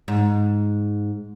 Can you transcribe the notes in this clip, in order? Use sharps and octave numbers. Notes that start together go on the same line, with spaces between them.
G#2